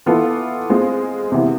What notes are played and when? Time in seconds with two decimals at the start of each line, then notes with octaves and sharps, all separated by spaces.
0.06 E3 B3 F4 A4
0.70 G#3 C4 F4
1.32 C3 E3 B3